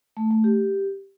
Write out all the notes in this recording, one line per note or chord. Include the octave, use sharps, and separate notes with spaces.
A3
A3
G4